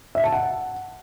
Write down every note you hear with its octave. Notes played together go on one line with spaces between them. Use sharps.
E5
A5
F#5